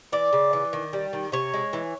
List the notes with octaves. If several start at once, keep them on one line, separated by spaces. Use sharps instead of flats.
E3 D5
C#3
E3
D#3
G3
D#3
C3 C#5
G#3
E3